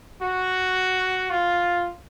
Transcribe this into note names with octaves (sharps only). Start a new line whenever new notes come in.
F#4
F4